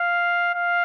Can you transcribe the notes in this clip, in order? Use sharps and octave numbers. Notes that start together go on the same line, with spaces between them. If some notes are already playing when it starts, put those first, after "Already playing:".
Already playing: F5
F5